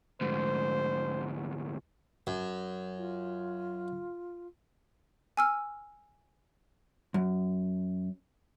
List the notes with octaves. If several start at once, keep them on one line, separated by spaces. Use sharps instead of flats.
D2 G#2 C5
F#2
F4
G#5 E6 F6
F#2